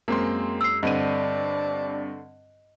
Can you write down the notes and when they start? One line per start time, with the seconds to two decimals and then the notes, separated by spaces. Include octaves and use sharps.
0.08 F#2 G#3 A#3 C4 C6
0.61 E6 C7
0.83 G2 D3 C4 D4 D#5 D#7